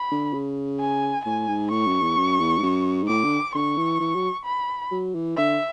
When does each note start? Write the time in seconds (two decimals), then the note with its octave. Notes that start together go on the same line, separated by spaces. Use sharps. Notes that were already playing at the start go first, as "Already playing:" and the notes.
Already playing: B5
0.11 D3
0.33 C#3
0.80 G#5
1.25 A2 G#5
1.48 G#2
1.71 A2 C#6
1.87 F#2
2.01 E2
2.17 F#2
2.40 E2
2.58 G#2
2.63 F#2
3.03 G#2
3.08 A2 D6
3.24 D3
3.55 D3 C#6
3.77 E3
4.00 E3
4.15 F#3
4.45 B5
4.91 F#3
5.14 E3
5.37 D3 E5